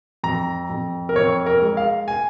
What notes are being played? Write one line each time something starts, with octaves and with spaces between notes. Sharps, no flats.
F2 A#5
F2
A#4
F2 C#5
A#4
G#3
F5
G#5